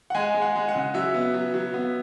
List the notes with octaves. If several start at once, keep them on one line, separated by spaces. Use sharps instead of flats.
F#5
G#3 G#5
G#3
F#5
G#3
F#5
C#3
F#3 E5
B3
F#3
F#3
B3